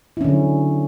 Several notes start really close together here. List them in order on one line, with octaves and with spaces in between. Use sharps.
E4 C#4 D3 F#3